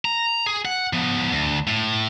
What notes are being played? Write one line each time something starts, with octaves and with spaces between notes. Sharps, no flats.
A#5
G#4
F#5
F3 B3
D2
A2